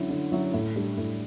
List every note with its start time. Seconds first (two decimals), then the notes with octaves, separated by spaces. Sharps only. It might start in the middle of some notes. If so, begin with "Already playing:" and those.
Already playing: D3 F#3 C#4 E4
0.10 D3
0.32 F#3 C#4 E4
0.53 A2
0.76 G3 D4
0.98 A2